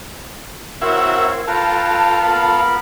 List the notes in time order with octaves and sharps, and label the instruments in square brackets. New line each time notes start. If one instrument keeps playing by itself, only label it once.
[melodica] C4 C#5 F5 [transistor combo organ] E4 F#4 E5 [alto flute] A#4
[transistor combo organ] F4 A4 [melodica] B4 G5 A#5 [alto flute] A5
[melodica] B3 A#4 B5